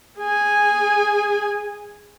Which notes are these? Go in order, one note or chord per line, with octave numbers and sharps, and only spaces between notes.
G#4 G#5